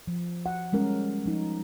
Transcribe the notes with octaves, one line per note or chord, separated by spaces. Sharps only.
F3
F#5
G3 G#3 C#4 A#4
F3 D#4